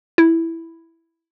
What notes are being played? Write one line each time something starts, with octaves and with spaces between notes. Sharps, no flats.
E4